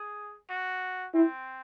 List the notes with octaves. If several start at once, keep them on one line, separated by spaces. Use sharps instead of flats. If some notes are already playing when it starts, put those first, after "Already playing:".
Already playing: G#4
F#4
C4 E4